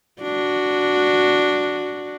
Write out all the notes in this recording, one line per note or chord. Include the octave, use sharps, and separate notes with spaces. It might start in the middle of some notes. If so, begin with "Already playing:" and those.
D4 F#4